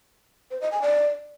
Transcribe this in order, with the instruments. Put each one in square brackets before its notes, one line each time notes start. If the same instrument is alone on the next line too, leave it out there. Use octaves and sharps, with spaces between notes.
[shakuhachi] C5
D#5
G#5
D5